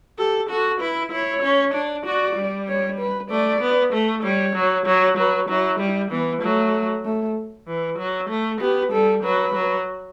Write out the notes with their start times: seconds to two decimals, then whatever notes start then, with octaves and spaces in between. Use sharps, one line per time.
0.18 G4 A4
0.50 F#4 A4
0.81 E4 B4
1.12 E4 C#5
1.42 C#4
1.74 D4
2.05 F#4 D5
2.36 G3
2.68 C#5
2.99 B4
3.31 A3 D5
3.61 B3
3.93 A3
4.23 G3 C#5
4.56 F#3
4.86 F#3 C#5
5.17 F#3 B4
5.49 F#3 E4
5.80 G3
6.11 E3 B3
6.42 F#3 A3
7.05 A3
7.67 E3
7.98 F#3
8.30 A3
8.61 B3 G4
8.92 G3 A4
9.23 F#3 B4
9.54 F#3